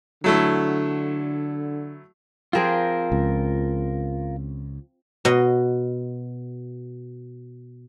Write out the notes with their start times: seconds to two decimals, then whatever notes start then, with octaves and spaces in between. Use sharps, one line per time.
0.24 D3 F#3 A3 E4
2.53 F3 C4 F4 G#4 A#4
3.12 C#2
5.25 B2 D#5